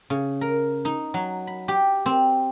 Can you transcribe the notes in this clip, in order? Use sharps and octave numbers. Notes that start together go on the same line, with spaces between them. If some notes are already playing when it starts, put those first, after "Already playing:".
C#3
A#4
D#4
F#3
B5
G4
C4